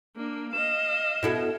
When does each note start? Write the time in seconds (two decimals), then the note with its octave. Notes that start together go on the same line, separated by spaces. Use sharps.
0.16 A#3 D4
0.52 D#5 F5 E7
1.23 B2 E4 A4